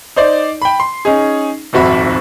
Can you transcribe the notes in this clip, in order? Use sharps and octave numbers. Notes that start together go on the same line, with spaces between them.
D#4 C5 D5
G5 B5
C6
C#4 D#4 G#4
D#1 G#1 F2 F#4 E5 B5